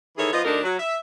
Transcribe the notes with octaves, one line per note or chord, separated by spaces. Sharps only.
D#3 E3 E4 G#4 A4 C#5
F3 B3 F4 B4 D#5
D2 D3 D4 D#4 A#4
F#3
E5